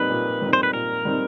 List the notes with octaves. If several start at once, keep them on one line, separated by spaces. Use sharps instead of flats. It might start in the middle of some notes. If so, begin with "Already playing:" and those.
Already playing: A#2 G3 C4 D#4 B4
A#2
G3 C4 D#4
C5
B4
A#2 A#4
G3 C4 D#4